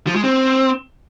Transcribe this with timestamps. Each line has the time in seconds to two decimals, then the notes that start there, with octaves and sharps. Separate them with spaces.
0.07 F3
0.15 G#3
0.24 C4